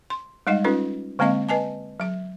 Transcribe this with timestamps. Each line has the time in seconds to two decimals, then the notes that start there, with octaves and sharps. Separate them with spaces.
0.10 C6
0.47 G3 G#3 D#4 D#5 F#5
0.64 C#4 D#4 F4 A4 B4
1.19 D3 G#3 A#3 C4 D#5 F5
1.49 B4 D#5 G#5 A5
2.00 F#3 E5